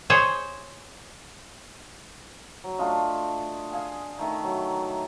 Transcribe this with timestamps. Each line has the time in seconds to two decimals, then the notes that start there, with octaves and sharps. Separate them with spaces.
0.10 G#4 C5 C#5
2.64 F#3
2.79 A3 D4 F4 D#5
3.72 G#4 F5 G#5
4.19 D#3 A3 E5 A#5
4.44 F#3